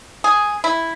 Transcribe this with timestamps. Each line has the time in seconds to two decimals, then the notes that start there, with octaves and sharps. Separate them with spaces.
0.24 G#4
0.64 E4